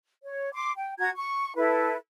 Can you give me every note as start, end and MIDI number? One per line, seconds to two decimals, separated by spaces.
0.24 0.50 73
0.54 0.72 84
0.54 0.72 86
0.76 0.94 79
0.98 1.10 66
0.98 1.10 82
0.98 1.10 92
1.16 1.54 85
1.56 1.95 64
1.56 1.95 69
1.56 1.95 71